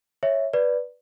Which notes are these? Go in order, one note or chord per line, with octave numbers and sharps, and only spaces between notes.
C#5 E5
B4 D5